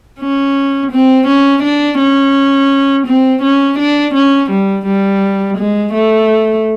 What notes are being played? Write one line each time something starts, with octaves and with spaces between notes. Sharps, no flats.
C#4
C4
C#4
D4
C#4
C4
C#4
D4
C#4
G3
G3
G#3
A3